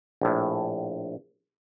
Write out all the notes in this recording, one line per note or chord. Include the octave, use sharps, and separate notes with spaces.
A#1 A2